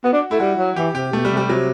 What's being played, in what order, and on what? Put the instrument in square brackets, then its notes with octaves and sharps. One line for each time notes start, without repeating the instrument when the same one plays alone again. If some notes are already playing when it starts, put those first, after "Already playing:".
[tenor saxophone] B3 [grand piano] F#4
[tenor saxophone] D4
[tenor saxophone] A3 [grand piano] E4
[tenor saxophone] G3 [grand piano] F#4
[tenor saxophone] F#3
[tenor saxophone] E3 [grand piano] G4
[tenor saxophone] C3 [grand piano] G4
[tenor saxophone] B2 [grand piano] A3
[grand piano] G3
[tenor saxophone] C3
[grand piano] G3
[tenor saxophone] C3 [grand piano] F#3